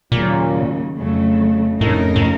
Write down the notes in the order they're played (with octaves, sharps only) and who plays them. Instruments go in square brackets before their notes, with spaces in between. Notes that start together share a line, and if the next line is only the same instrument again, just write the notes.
[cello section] D#2 C#3 F#3 [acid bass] A#2
[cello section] F2 C#3 F#3 A3
[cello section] F2 C#3 A3 D#4 A#4 [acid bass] A2
[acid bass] A2